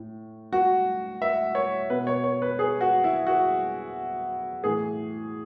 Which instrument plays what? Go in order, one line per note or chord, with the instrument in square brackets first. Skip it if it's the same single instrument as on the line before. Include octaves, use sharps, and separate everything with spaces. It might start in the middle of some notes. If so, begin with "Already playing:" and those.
Already playing: [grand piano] A2
F#4
E5
C#5
B2 B4
C#5
C#5
B4
G#4
F#4
E4
F#4
A2 E3 G#4